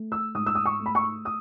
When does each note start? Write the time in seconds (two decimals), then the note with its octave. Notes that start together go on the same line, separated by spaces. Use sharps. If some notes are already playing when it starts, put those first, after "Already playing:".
Already playing: A3
0.12 E6
0.35 G#2 D#6
0.46 E6
0.55 D#6
0.65 C#6
0.80 A3
0.86 B5
0.95 C#6
1.25 D#6